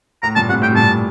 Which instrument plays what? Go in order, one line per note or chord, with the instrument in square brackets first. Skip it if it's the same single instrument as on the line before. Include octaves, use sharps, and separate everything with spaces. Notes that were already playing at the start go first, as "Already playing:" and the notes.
[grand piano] A2 [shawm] A#5
[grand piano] G2 A#2 [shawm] A5
[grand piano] A2 C3 [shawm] F#5
[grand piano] A2 [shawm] G5
[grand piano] C3
[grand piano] G2 A#2 [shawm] A5